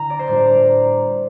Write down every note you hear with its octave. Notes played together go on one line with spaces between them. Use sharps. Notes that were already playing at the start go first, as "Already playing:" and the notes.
Already playing: D3 E4 A#5
D5
C5
A2 G3 D4 F4 D5
A#5